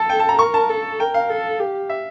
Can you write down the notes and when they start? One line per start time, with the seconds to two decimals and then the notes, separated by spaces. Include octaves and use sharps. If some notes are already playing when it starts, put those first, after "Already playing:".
Already playing: A4 A5
0.10 G5
0.20 A5
0.29 A#5
0.39 A#4 C#6
0.54 A5
0.69 A4
1.00 A#4 G5
1.14 F5
1.29 A4
1.60 G4
1.89 E5